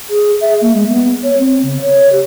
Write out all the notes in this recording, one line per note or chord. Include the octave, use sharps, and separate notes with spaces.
G#4
E5
A#3
G#3
B3
C#5
C4
C#3
C#5
G4